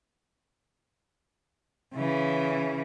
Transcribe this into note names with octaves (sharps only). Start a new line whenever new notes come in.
C#3 E3